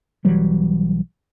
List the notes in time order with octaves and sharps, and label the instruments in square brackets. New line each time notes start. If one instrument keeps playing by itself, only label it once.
[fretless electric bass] B1 E3 F#3 G3